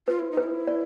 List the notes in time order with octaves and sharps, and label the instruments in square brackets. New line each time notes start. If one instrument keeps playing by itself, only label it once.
[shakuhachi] F4 [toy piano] B4
[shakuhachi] E4
D#4
[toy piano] B4
[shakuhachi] E4
[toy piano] D5